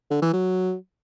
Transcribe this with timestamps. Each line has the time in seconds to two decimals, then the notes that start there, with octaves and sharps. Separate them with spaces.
0.11 D3
0.22 E3
0.33 F#3